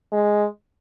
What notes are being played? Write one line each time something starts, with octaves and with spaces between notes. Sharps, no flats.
G#3